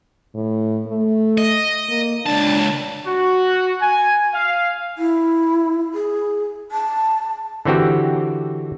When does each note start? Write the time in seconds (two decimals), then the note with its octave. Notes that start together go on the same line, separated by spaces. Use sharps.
0.35 A2
0.87 A3
1.38 D#5
1.89 A#3
2.26 C#2 D4 A5
3.06 F#4
3.81 G#5
4.34 F5
4.98 E4
5.94 G#4
6.72 A5
7.65 D3 E3 C4 F#4 G4